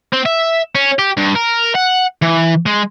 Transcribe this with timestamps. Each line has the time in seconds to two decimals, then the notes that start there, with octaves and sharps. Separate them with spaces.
0.13 C4
0.26 E5
0.75 C#4
0.99 G4
1.17 G2
1.35 A#4
1.75 F#5
2.22 E3
2.66 G#3